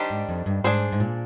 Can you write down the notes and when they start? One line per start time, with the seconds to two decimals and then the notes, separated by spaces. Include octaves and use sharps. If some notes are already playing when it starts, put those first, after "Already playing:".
Already playing: D#3 G3 D4 G4 C5
0.10 G#2
0.29 F2
0.46 G2
0.64 G#2 D4 G#4 C5
0.92 G#2
1.00 A#2